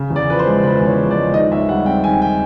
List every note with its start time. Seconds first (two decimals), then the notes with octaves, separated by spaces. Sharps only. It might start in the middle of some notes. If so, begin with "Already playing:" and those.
Already playing: C#3
0.10 E2
0.16 D5
0.28 F3 B4
0.39 C5
0.46 G#3
0.63 C#3 B4
0.81 E2
0.86 C#5
0.98 F3
1.11 D5
1.17 G#3
1.33 D#3 D#5
1.51 D#2 E5
1.69 G3 F#5
1.86 C4 G5
2.03 D#3 G#5
2.22 G5